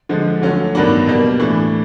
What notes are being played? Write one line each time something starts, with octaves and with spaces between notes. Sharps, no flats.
D3 F3 G#3
D3 F#3 A3 C#4 F4
G2 D#3 F#3 B3 D4
B2 G3 A#3
A2 E3 A3 D4